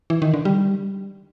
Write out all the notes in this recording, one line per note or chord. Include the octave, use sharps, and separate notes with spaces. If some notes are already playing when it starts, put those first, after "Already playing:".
E3
D#3
D3
G3